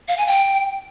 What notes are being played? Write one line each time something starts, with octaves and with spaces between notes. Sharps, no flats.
F5
G#5
G5